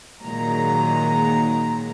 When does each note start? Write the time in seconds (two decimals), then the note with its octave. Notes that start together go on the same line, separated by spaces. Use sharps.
0.23 A#2 D#3 F#3 G#3 A#5